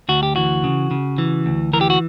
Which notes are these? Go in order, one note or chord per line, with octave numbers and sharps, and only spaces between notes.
D2 F#4
G4
E3 F#4
C#3
C#3
E3
D2
E3 A#4
G4
F#4